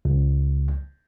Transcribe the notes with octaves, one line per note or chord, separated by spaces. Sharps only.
C#2